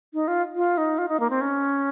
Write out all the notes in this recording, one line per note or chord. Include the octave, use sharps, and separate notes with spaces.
D#4
F4
F4
D#4
F4
D#4
A#3
C4
C#4